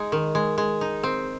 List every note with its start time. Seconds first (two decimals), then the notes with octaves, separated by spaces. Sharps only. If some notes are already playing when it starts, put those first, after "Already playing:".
Already playing: G#3 D#4
0.12 D#3
0.35 G#3
0.58 G#3
0.81 D#4
1.03 C4